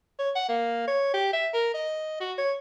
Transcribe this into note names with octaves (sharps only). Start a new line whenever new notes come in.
C#5
F#5
A#3
C#5
G4
E5
A#4
D#5
F#4
C#5